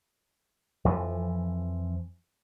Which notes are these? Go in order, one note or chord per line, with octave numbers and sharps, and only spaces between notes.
F2 E3 F3